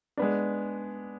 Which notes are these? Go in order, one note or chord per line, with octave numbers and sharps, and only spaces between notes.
G#3 B3 D4